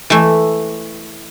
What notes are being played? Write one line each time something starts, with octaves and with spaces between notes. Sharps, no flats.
E3 A3